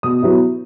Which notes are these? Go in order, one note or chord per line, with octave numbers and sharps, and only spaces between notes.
B2 D#6
F#3 B3 E4